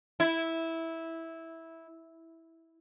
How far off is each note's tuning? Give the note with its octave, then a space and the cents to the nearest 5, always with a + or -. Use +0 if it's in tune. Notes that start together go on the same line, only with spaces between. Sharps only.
E4 -10